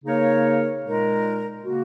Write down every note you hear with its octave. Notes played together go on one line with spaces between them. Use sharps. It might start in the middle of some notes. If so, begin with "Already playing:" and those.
C#3 A#3 D#4 A#4 C#5
A#2 G#3 D#4 A#4
C#3 A#3 F#4